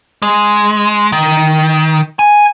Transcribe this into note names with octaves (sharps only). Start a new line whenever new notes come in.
G#3
D#3
G#5